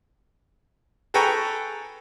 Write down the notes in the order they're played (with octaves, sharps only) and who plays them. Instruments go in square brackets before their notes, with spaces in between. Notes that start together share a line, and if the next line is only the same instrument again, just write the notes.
[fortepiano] G#4 A4 B4 G5 A#5 C#6